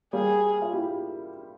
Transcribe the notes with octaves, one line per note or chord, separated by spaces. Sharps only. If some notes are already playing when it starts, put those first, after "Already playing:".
G3 A#3 G#4
F4
E4 G4